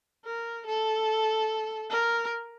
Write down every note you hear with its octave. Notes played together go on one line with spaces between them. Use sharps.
A#4
A4
A#4